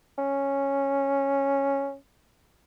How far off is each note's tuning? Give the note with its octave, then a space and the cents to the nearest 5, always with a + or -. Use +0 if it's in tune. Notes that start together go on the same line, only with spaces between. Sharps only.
C#4 -5